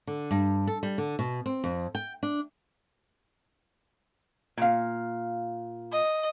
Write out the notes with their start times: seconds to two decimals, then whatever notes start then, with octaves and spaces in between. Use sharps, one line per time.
0.07 D3
0.31 G2
0.67 A4
0.83 G3
0.98 D3
1.19 B2
1.46 C4
1.64 F2
1.95 G5
2.23 D4
4.57 A#2 F5
5.92 D#5